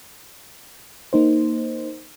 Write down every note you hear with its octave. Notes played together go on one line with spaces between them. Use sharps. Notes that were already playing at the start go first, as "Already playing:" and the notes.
A#3 D#4 C5